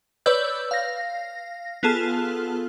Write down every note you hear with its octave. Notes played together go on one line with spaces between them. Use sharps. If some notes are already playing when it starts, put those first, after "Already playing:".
B4 C#5 D5 E6 G6
F5 A#6
B3 F4 G#4 A4 A5 F6